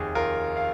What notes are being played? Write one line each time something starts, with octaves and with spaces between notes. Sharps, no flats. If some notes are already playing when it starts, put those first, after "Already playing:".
Already playing: F1 D#2 D#3 G#4
F4 A#4
F5